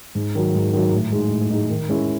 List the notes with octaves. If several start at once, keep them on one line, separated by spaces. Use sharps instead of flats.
G#2
D#3 F#3
G#2
D#3 F#3
A2
G#3 D#4
A2
G#3 D#4
D#3
G#3 C#4 E4